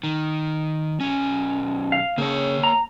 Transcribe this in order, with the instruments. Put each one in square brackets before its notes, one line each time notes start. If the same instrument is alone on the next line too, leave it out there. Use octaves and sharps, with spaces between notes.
[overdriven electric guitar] D#3
B1 C#4
[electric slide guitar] F5
[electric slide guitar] C#3 [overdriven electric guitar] A#3 C#5
[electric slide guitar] A#5